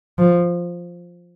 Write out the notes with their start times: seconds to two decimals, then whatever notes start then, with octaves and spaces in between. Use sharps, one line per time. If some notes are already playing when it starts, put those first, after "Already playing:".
0.18 F3